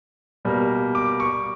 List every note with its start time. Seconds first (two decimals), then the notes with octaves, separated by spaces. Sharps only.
0.45 B2 G3 A#3
0.95 D6
1.20 C#6